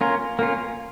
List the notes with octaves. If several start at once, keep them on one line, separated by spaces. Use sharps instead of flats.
A#3 C#4 F4
A#3 C#4 F4